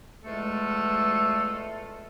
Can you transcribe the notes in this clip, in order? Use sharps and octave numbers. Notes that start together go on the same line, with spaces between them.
E2 G#3 A3 F4 A4